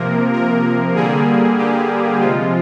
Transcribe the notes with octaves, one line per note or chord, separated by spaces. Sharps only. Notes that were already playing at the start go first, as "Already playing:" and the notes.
Already playing: C3 F3 A#3 A#4
A#4
D3 G3 A#3 G#4
G4
C3 F3 G#3 F4